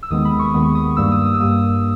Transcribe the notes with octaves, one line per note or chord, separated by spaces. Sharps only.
E6
D#2 D#3 G#3 B3 D#6
B5
C#6
D#2 D#3 G#3 B3 D#6
D#6
G2 G3 A#3 E6
D#6
D#6
E6
G2 G3 A#3 D#6